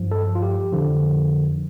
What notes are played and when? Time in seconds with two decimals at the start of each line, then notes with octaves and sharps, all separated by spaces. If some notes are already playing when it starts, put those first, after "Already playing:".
Already playing: G2 F3
0.11 A4
0.35 F4
0.42 G4
0.72 F2 D3 F3